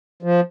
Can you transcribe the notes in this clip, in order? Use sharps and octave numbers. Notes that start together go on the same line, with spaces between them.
F3